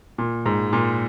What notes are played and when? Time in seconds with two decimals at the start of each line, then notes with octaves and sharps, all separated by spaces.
0.18 A#2
0.46 G#2
0.73 A#2